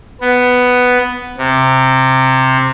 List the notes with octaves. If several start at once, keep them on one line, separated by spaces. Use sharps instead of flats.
B3
C3